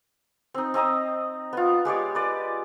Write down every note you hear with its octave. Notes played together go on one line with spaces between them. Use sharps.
C4 D#4
C4 D#5 A#5 D#6
B3 F4
G#3 G4 C#5 D5
B4 D5